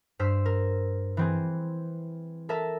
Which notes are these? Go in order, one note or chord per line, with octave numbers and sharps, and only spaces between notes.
G2 C5 E6 F6 B6
A#4
E3 C4 G#4
A4 A#4 E5